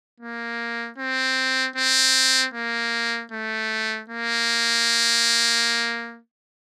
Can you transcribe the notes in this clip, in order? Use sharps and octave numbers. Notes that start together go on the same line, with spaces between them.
A#3
C4
C4
A#3
A3
A#3